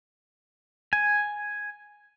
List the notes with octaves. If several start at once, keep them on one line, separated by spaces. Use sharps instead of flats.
G#5